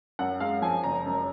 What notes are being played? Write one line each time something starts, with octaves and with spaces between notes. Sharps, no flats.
F#2 F#5
G#3 F5
F3 G#5
F#1 A#5
F#2